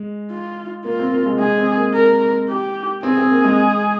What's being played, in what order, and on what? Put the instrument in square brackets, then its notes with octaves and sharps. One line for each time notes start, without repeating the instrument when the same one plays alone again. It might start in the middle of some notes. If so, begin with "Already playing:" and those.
Already playing: [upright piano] G#3
[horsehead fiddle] F4
[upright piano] A#3 [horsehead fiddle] F4
[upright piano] C4
A#3
G#3
[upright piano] G#3 [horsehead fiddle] G#4
[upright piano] C4
A#3
[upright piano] A#3 [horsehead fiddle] A#4
[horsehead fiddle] G4
[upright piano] C4 [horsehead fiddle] G#4
[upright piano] C4
A#3
G#3